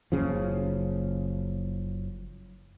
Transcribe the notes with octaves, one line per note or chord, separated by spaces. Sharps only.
F#1 C#3 F3